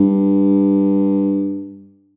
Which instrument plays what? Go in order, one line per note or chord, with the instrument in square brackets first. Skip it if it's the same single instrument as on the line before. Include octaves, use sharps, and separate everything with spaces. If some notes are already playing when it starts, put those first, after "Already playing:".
Already playing: [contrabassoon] G2